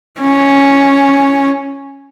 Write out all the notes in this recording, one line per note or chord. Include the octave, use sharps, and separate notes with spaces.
C#4